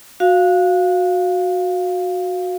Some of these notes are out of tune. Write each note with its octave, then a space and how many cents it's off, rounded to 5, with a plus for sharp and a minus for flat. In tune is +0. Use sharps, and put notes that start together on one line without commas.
F#4 -15 F5 +0